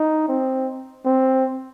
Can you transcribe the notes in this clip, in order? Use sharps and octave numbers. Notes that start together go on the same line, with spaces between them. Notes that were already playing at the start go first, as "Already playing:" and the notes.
Already playing: D#4
C4
C4